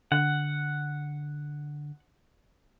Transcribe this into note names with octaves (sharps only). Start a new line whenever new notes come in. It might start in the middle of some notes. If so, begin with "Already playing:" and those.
D3 F#5